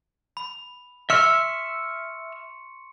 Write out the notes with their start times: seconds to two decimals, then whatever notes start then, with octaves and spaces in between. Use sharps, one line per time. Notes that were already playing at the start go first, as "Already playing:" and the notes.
0.37 B5
1.10 E5 C6 C#6 E6 F6 C#7